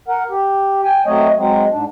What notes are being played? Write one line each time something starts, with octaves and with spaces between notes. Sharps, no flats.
A#4 F#5
G4
G5 G#5
F#3 A3 C4 C#5 D#5
F#3 G#3 C4
G#2 D4